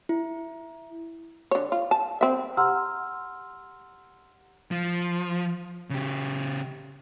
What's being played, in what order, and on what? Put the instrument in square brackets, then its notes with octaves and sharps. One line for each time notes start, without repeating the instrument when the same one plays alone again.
[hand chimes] E4
[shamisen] D3 C#5
F4
A5
C4 E5
[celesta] G4 F#5 A#5 C6 E6 F6
[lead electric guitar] F3
C#3 G4